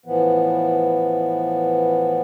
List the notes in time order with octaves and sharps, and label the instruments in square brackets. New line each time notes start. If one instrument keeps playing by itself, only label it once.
[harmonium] A2 E3 F3 B3